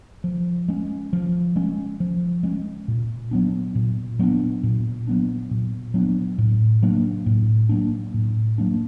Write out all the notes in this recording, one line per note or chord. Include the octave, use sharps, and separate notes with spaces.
F3
G#3 C#4
F3
G#3 C#4
F3
G#3 C#4
A#2
F#3 B3 D4
A#2
F#3 B3 D4
A#2
F#3 B3 D4
A#2
F#3 B3 D4
A2
F#3 A#3 D4
A2
F#3 A#3 D4
A2
F#3 A#3 D4